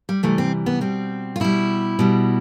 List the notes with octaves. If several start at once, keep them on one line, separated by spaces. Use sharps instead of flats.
G3
C3 E3 G3 A3
C4
B3
B2 G3 C4
F4
B2 G3 E4
B2 G3